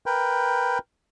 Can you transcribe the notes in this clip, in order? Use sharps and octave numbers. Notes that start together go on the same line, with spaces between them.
A#4 B4 G5